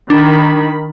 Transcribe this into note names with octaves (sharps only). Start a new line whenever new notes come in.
D#3 D4 B5